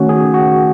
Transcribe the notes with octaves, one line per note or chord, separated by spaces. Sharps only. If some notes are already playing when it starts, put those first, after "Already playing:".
Already playing: D#3 A3 C#4 F#4
G#4
F#4